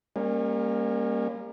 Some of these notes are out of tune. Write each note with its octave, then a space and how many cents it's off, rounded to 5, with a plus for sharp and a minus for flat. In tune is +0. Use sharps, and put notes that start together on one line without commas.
G3 +40 A#3 +0 C#4 -20